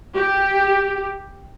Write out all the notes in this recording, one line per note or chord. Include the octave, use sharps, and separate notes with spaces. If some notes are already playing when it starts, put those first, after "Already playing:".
G4